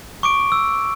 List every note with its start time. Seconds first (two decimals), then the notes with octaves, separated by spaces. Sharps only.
0.23 C#6 D6 D7
0.52 E6